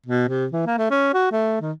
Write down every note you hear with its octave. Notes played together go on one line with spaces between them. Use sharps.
B2
C3
E3
A#3
A3
C#4
F#4
A3
D#3